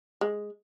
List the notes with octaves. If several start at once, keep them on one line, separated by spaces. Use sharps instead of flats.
G#3